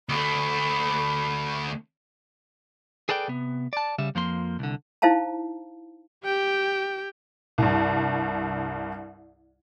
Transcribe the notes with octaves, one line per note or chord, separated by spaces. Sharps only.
D2 A3 B5
G#4 A4 B4 D5 G5
C3 B3
D5 A5
C#3 G3 E5
F2 F3 A#3 C6
C2 D3
D#4 E4 C5 F5 A5 A#5
G4 G5
C2 G2